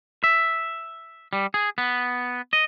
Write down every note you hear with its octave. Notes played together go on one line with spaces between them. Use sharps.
E5
G3
G#4
B3
D#5